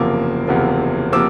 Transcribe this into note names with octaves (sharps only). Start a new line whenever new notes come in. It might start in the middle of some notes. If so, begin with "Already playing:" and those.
Already playing: F#1 E2 C3 F3 A#3 D6 E6
F#1 E2 C3 F3 A#3
C3 F3 A#3 D6 E6